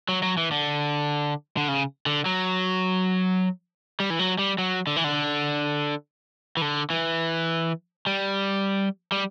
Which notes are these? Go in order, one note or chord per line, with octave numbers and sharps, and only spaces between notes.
F#3
F#3
E3
D3
D3
C#3
D3
F#3
G3
E3
F#3
G3
F#3
D3
E3
D3
E3
D3
E3
G3
G3